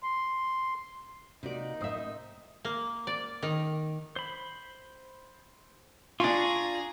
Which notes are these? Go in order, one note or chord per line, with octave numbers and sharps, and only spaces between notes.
C6
C3 A#3 D#4 F#4 D5
A1 C5 E5 D#6
A#3
D5
D#3
C5 B5
D4 F4 G#4 A#5 C#6